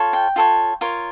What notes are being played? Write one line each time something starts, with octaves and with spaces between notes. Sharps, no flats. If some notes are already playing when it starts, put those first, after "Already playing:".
Already playing: F4 A4 C#5
G5
F4 A4 C#5
F4 A#4 C#5